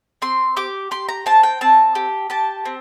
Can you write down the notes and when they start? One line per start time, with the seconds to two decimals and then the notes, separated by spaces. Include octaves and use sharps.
0.22 C4 C6
0.57 G4 D6
0.91 G4 C6
1.09 A#5
1.26 C4 A5
1.43 G5
1.61 C4 A5
1.95 G4
2.30 G4 A5
2.65 C4